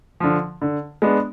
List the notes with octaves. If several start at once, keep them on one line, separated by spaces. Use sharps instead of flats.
D3 F3
D3
G#3 B3 D4